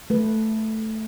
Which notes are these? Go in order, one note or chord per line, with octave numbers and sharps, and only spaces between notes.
A3 B4